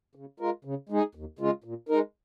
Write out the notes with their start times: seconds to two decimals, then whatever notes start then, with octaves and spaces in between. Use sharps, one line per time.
0.15 C#3
0.40 G#3 F4 A#4
0.65 C#3
0.89 G#3 D#4 G#4
1.15 D#2
1.39 C#3 G#3 F4
1.64 A#2
1.89 G#3 D#4 A#4